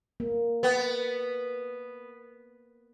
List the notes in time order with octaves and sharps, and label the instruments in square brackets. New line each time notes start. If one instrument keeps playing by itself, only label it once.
[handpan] A#3
[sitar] B3